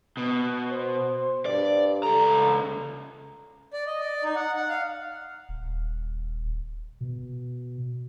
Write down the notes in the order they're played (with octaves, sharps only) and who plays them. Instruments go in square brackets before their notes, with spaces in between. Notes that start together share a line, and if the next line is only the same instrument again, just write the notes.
[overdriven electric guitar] B2
[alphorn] C5
[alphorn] G2 [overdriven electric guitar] D5
[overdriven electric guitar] C#2 A#5 [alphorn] A4
[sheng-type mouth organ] D5
D#5
D5
D#4
F#5
F#5
F5
[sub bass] D#1
B2